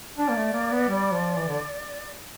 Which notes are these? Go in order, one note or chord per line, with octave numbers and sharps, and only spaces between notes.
D4 D5
A#3
A3
A#3
B3
G3
F3
E3
D3